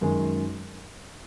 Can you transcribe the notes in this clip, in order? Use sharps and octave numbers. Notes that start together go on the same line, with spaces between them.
F#2 D#3 G#3